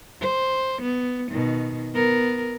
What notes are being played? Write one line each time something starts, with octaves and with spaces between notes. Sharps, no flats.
C5
B3
B2 D#3
B3 A#4